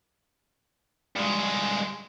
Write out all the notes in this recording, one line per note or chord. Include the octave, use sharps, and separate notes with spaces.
G2 G#3